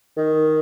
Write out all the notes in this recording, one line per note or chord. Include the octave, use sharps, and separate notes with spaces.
D#3